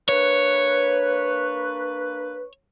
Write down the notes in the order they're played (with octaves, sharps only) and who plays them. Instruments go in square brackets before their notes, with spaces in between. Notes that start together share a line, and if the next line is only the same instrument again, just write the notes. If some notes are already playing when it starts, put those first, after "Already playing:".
[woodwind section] A#3 D4 B4 [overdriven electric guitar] C#5